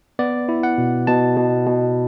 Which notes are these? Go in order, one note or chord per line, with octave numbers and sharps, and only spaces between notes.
B3 D5
E4
F#5
B2
B2 A5
B2
B2